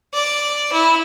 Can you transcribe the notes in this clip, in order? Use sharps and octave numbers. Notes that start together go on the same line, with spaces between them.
D5
E4